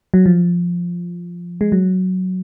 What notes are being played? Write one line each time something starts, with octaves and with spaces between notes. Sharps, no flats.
F#3
F3
G#3
F#3